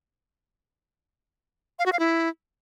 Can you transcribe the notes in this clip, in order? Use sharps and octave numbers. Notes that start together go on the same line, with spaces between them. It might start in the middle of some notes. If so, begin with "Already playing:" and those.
F5
F#4
F5
E4